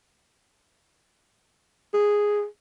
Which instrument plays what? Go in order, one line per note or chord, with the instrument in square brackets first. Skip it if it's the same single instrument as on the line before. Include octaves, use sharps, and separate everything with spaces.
[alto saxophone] G#4